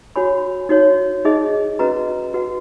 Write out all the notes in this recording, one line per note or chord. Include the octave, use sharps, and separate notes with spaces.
F#4 C#5 G#5 B5
D#4 F#4 C#5
D#4 G#4 D#5
C#4 F#4 B4 D#5 A#5
F#4 B4 F#5